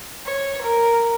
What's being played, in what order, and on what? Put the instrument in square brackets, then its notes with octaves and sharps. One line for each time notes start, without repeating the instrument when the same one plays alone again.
[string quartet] C#5
A#4